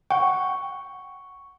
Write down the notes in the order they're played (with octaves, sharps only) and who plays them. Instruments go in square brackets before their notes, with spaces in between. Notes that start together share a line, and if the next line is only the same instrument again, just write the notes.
[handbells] F#5 G5 [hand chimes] C#6